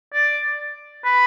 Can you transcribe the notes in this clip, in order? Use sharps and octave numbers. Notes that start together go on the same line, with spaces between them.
D5
B4